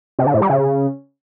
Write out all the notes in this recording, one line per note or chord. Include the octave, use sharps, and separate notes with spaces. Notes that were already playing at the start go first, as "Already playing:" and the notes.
C3
D3
A2
G3
C#3